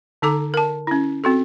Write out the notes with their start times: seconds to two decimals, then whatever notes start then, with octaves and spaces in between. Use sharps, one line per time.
0.22 D3 D#4 A4 A#5 D6
0.54 A#4 A5
0.87 C#4 E4
1.24 C4 F#4 A4